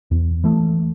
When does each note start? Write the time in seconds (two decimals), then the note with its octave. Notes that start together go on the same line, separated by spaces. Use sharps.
0.11 E2
0.44 E3 A3